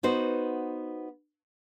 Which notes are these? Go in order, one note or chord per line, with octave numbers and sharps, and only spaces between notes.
B3 D#4 F#4 C5